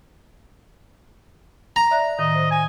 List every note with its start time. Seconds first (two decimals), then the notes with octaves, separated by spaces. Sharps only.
1.76 A#5
1.91 D5 E5 F#6
2.19 A2 D#3 D#5
2.35 C5
2.51 G#5